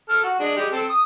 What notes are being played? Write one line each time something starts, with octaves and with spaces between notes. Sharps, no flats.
A4 F6
F#4
G#3 D4
G3 G#3 G4
C4 A4
D#6